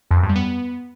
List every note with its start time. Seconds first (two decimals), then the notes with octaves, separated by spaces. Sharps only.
0.11 F2
0.17 F#2
0.23 G2
0.29 G3
0.36 B3